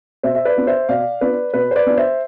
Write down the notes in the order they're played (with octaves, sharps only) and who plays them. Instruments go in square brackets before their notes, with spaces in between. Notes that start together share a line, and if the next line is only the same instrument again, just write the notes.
[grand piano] B2 C5 E5
E5
B4 D5
B3 D4 F4
C5 E5
B2 D5 F5
B3 D4 F4 B4 D5
B2 B4
C5
B4 D5
B3 D4 F4
C5 E5